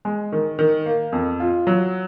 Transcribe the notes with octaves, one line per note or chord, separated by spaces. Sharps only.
G#3
D#3
D#3
A#3
F2
F4
F#3